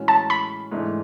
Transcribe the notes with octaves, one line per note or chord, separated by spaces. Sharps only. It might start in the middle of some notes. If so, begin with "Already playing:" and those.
Already playing: A2 E3 G#3 C#4 F#4
A5
B5
G#2 E3 A3 D4